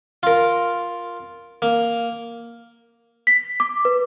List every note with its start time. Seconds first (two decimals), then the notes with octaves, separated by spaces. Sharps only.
0.23 F4 A#4
1.62 A#3
3.27 B6
3.60 D6
3.85 B4